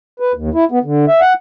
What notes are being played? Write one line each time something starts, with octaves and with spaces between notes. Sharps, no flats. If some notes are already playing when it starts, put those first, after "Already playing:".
B4
D#2
E4
B3
D3
E5
F#5